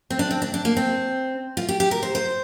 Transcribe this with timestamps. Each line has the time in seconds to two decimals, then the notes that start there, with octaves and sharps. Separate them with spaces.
0.10 C4
0.19 D4
0.31 C4
0.42 D4
0.54 D4
0.65 A#3
0.77 C4
1.57 F4
1.69 G4
1.80 G4
1.91 A#4
2.03 C5
2.15 C5